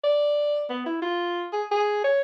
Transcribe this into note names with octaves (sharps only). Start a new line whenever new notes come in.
D5
B3
E4
F4
G#4
G#4
C#5